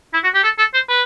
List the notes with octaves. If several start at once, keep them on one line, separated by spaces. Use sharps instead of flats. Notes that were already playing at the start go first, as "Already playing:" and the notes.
E4
F#4
G4
A4
A4
C5
B4